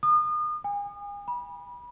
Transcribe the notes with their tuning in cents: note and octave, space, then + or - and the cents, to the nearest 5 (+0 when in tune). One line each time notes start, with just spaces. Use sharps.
D#6 -35
G#5 -35
B5 -30